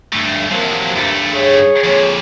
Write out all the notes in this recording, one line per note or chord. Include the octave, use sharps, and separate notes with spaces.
G2 A3
C3 F3 F#3 A#3
G2 A3
G#4 C#5
F2 A#2